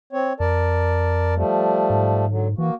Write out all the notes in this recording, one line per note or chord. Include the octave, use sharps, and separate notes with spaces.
C4 C#5
F2 A#4 D5 A5
F3 G3 A3
G#2
D3 F#3
E3 A#3 F#4